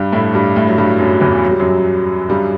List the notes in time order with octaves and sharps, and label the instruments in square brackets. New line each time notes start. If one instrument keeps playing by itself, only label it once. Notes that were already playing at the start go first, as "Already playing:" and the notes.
Already playing: [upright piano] G2 G3
A2 A3
G2 G3
A2 A3
F#3
G2 G3
F#2 F#3
E2 E3
F#3
G3
F#2 F#3
G2 G3